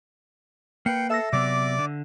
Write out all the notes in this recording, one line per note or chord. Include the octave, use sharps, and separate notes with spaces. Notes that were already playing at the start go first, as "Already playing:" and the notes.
A#3 B4 G5 C7 C#7
A4 E5 E6 A#6
C3 F#3 B3 D5 D6
D3